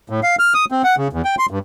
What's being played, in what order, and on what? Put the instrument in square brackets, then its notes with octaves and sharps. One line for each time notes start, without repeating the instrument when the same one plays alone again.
[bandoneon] A2
F5
F6
D#6
C4
F#5
C#3
E2
G5
C6
G2